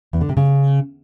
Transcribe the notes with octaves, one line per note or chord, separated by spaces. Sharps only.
E2
D3
C3
C#3